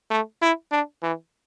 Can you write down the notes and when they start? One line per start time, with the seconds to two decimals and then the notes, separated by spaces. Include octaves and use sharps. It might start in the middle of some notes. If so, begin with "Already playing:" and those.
0.11 A3
0.42 E4
0.71 D4
1.03 E3